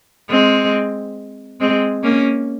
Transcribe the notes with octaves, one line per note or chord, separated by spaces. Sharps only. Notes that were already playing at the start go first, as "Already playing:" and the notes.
G#3 C4
G#3 C4
A#3 C#4